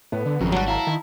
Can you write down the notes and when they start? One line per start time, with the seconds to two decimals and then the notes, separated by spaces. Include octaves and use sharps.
0.12 A2 B3
0.26 D3
0.41 G#1 F2 C#3 F#3
0.52 F#3 G3 F#4 A5
0.68 E4 F5 A5 A#5
0.87 D#3